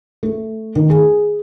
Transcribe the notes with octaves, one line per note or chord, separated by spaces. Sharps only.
A3
D#3
G#4